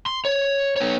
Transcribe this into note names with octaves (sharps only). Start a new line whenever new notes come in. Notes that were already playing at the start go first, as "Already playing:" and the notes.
C6
C#5
B3 C#5